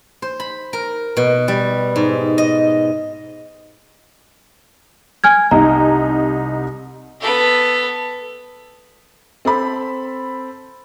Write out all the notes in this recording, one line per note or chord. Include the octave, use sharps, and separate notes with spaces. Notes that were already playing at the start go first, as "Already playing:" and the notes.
C5
B5
A#4
B2
G3
G#2
D#5
G#5 F6 G#6
C2 D#4 A#5
B3 A4
C4 A4 B5